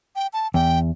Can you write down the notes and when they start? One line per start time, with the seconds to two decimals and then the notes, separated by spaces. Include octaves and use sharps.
0.16 G5
0.33 A5
0.54 E2 G5